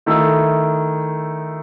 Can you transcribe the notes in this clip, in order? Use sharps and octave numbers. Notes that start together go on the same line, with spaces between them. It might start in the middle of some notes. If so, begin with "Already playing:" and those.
D#3 A3 E4 A4